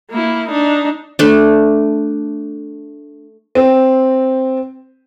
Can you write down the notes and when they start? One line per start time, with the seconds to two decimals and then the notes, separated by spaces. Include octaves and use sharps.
0.11 A#3 E4
0.49 D4 D#4
1.19 A3 D4
3.55 C4